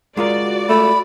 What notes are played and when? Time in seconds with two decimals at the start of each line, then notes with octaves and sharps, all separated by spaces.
0.17 G#3 F4 F#4 A#4 D5
0.69 A3 B5